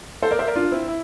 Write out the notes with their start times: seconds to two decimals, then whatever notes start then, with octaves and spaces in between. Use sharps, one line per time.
0.22 A4 C5
0.31 A#4 D5
0.39 C5 E5
0.47 A#4 D5
0.56 D4 F4
0.72 C4 E4
0.88 E4